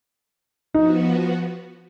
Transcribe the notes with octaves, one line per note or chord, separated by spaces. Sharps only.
F3 B3 D#4 F#4